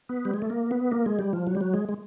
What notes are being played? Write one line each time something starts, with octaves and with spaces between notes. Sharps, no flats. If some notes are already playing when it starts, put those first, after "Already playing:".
B3
G3
G#3
A3
A#3
B3
A#3
G#3
G3
F3
F#3
G3
F#3
G#3
G#3